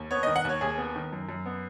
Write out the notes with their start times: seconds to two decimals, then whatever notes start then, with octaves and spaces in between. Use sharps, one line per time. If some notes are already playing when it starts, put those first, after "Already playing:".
Already playing: D#2
0.11 B3 C#5
0.23 D#5
0.27 D#3
0.36 F#5
0.45 D#2 C#5
0.61 D#2 G#4
0.78 B3
0.96 D#3
1.13 F#2
1.29 F#2
1.46 B3